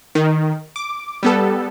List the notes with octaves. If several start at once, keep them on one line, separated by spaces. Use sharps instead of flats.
D#3
D6
G3 B3 A4